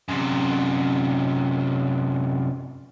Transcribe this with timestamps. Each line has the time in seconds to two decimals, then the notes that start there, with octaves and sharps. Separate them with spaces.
0.08 F#2 C3